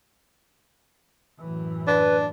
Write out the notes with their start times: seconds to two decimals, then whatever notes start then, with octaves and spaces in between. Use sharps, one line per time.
1.41 F#2 A2 E3
1.87 D4 B4